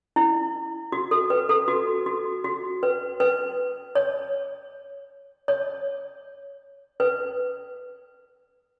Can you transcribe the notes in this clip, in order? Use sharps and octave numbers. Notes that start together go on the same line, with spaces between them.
E4
F#4
A4
B4
A4
F#4
F#4
F#4
B4
B4
C#5
C#5
B4